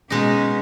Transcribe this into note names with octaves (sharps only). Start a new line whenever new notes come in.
B2 G#3 C#4 D#4